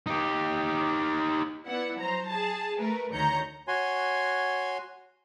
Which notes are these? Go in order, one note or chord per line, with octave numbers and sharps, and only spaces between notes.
D#4 G4
B3 E4 D5 F#5
F#3 C5 A#5
G#4 A5
A3 A#4 B4
D2 D#3 C#5 A#5 G6 C#7
F#4 C#5 G#5 C6